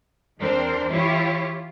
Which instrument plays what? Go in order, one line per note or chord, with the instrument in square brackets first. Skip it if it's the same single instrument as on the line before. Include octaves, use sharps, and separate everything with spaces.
[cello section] E2 C4 D4 A#4 C5
E3 E4 F4 G4 C#5